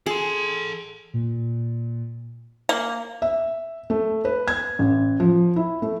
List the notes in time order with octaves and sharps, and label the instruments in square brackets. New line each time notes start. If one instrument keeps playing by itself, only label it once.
[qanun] G#4 [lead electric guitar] A4 C6
[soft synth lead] A#2
[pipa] A#3
[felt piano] E5
A3
B4
G#6
A1
F3
E4
A3